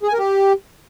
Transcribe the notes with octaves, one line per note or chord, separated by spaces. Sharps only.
G#4
G#5
A#4
G4